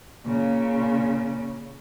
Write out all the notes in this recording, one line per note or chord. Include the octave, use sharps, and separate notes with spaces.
A#2 C#3